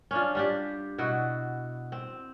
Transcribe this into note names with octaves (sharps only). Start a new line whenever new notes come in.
C#4 D4 F4
G3 D4 G4
B2 E4 F#4
C4